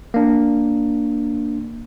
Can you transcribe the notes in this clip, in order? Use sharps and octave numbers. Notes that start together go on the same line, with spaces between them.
A#3 D4